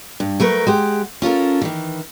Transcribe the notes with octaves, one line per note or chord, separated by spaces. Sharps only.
G2
F#3 A3 A#4 B4
G#3 G4 F#5
C#4 F4 A4 A#4
D#3 E3